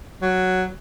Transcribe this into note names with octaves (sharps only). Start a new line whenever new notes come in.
F#3